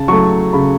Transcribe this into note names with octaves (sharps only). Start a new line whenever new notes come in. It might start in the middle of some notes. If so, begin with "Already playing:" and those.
Already playing: C#3 A5
F#3 A3 C#6
C#3 B5